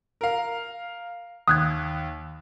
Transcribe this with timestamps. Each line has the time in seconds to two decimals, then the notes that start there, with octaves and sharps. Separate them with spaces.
0.21 A#4 F5
1.48 D#2 D#6 F#6 G#6